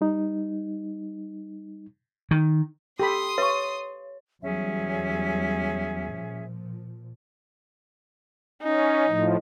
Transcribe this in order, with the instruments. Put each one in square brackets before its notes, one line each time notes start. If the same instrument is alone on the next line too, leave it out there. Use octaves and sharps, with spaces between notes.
[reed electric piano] G3 D#4
[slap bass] D#3
[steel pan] G4 A4 B5 [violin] C6 D#6
[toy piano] B4 C#6 [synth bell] C#5
[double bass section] E2 F#3 G3 [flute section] C#4 G#4 E5
[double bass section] A#2 F3
[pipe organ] C#4 [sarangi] D#4
[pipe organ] A2 F3